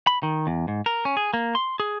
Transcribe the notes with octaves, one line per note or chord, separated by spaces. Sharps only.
B5
D#3
E2
G#2
A#4
C#4
G#4
A#3
C6
G#4